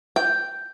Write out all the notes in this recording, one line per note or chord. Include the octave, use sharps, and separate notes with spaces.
G5